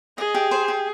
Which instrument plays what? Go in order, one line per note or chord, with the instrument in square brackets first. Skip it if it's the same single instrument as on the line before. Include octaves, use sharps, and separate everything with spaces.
[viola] G#4 [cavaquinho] D#5
[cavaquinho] G4
C5
G4